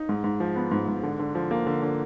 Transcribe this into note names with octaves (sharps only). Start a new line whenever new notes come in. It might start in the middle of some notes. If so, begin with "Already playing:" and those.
Already playing: D#4
G#2
G#2
F3
B3
G#2
G#2
D3
D3
F3
A#3
D3
D3